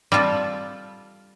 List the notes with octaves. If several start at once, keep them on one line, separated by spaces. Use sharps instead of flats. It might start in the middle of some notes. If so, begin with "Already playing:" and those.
G3 C4 F4 A4